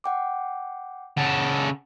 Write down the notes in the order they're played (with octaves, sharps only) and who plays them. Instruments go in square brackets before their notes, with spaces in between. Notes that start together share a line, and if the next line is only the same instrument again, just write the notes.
[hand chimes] F#5 G5 D6
[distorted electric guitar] C#3 A4 [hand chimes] F#5